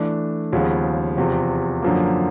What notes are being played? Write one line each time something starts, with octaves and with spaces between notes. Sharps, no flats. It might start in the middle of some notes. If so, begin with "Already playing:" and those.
Already playing: E3 A3 D4
D#2 C#3 F3 G#3 B3
E2 C3 F3
F#2 D3 F3 A#3